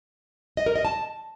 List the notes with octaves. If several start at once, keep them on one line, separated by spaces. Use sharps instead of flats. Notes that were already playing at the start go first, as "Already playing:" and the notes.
D#5
A#4
D#5
A5